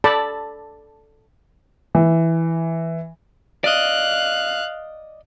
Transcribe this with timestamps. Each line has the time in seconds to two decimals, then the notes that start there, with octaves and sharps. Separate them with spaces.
0.04 A4 D5 A5 B5
1.95 E3
3.64 D5 D#5 F5 F#6